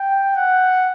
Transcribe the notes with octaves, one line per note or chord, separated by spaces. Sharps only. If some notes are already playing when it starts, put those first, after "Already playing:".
Already playing: G5
F#5